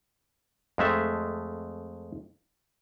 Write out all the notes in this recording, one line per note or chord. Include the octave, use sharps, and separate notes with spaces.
F2 G#3 A3 E5